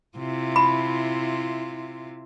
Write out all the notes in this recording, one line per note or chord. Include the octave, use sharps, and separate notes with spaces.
C3 E4 F4
B5